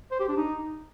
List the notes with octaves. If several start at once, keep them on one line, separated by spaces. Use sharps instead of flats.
C5
G4
D4
D#4